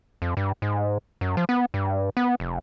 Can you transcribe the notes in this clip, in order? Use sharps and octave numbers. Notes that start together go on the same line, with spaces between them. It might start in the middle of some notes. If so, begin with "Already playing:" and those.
F2
G2
G#2
F#2
F3
B3
G2
B3
F1